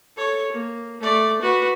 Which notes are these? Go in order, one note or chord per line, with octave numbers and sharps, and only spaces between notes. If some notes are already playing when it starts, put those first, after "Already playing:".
A4 C#5
A#3
A3 D5
F#4 B4